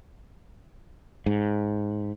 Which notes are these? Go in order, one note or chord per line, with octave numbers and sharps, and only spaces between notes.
G#2